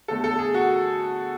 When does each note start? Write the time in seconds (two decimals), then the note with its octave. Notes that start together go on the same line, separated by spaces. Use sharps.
0.08 E2 D3 A3 A4
0.24 A4
0.39 G#4
0.54 F#4